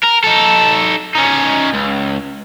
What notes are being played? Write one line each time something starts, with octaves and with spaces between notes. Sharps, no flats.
A#4
D#4 A4
C#4 D#4
C#2